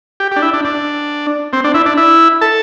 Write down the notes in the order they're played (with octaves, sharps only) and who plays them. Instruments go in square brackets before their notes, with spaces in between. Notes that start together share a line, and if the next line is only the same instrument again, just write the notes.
[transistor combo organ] G4
G4
D4
E4
D4
D4
C4
D4
E4
D4
E4
A4